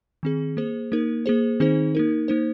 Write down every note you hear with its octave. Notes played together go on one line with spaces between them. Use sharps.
D#3 C4 G#4
A#3 G#4 C5
A#3 D#4 A#4
A#3 G#4 C5
D#3 C4 D#4 G#4 C5
A#3 D#4 A#4
A#3 D#4 C5